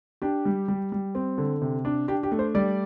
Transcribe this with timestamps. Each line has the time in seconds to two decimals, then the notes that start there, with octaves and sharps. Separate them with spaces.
0.22 D4 G4
0.45 G3
0.68 G3
0.92 G3
1.15 C4
1.38 D3
1.62 C3
1.85 D4
2.08 D4 G4
2.23 G4
2.32 A3
2.39 C5
2.55 G3 D5